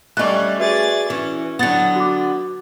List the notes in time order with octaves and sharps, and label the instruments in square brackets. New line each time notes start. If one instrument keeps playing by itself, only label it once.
[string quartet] G3 D5 [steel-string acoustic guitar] A3 C#4 [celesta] D#5 F#6
[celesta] F#4 B4 E5 [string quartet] G#4 D5 A6
[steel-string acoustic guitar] E3 [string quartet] C#4
[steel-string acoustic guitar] D3 B3 [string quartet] F#3 [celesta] F#5 A6 C#7
[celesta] F#4 D6